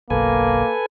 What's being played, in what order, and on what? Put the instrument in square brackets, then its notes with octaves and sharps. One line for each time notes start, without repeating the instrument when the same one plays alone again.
[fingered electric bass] F#1 B1 [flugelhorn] A#3 [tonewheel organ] A4 B4 G#5